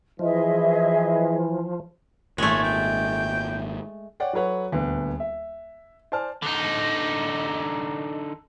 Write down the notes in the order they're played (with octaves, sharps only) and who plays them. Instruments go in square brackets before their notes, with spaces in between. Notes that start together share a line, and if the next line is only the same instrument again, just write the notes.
[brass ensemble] E3 [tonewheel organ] F3 [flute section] G#4 D#5 E5
[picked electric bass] G#1 A#2 [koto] G#3 A3 [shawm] C#5
[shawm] G5
[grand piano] C#5 D5 F#5 G5
F#3 A4 B4 C#5 F#5
D#1 D2 B3
E5
C5 D5 G#5 A5 F6
[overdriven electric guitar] D3 D#4